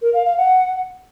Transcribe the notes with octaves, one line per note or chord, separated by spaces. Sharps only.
A#4
F5
F5
F#5